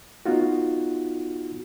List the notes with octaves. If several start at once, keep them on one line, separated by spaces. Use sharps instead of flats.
B3 D#4 F4 F#4